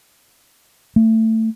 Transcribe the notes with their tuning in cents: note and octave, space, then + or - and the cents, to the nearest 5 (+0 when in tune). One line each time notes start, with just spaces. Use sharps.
A3 +20